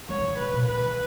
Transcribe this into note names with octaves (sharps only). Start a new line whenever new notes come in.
G#3 C#5
E3
D#3
C#3 B4
B2
B2 B4
C#3
D#3